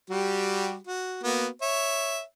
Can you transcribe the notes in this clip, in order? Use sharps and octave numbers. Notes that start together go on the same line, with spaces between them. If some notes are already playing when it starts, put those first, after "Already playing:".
G3 F#4 G4
F#4
A#3 B3 F#4
C#5 E5